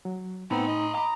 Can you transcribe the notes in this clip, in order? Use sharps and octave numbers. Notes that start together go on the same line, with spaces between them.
F#3
A2 B3 C4 D#4 A#5 B5
D#5
A#5 B5 D6 D#6